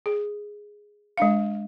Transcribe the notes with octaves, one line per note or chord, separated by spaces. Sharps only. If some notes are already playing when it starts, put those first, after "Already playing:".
G#4
G#3 D4 F5